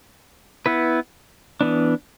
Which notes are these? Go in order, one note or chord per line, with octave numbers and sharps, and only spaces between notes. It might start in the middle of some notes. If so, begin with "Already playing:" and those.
B3 E4 B4
E3 B3 D4